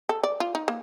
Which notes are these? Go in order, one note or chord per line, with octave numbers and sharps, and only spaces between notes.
A4
D5
F4
D#4
A#3